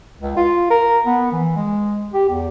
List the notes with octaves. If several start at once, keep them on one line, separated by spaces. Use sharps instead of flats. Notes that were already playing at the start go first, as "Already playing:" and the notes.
C#2
F4
A#4
B3
E3
G#3
G4
E2